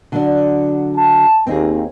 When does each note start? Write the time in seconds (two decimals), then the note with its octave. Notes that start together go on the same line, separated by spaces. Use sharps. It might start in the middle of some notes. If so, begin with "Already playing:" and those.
0.12 D3 F#3 D4
0.96 A5
1.47 D#2 C4 D#4 G#4